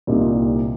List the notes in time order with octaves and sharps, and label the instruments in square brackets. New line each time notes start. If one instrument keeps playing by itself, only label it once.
[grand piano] C2 A#2 G3 C4 D#4